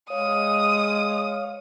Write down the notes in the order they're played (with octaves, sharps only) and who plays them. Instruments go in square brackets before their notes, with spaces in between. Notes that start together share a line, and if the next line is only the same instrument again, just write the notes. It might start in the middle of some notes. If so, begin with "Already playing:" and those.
[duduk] G#3 [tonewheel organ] C#5 F5 [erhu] D#6